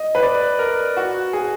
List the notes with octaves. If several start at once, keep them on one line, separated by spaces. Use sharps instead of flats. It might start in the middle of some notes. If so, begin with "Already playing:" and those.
Already playing: D#5
B4
D5
A#4
F#4
G#4